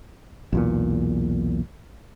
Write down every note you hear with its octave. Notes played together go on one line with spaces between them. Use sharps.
B1 E2 A#2